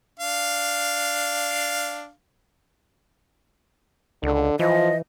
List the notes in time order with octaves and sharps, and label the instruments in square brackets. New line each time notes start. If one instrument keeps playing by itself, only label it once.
[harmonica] D4 F5
[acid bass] C#2 [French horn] D3
[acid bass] E3 [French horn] F3 [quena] D#5